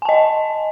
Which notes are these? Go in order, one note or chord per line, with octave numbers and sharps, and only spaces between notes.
D#5 G#5 A5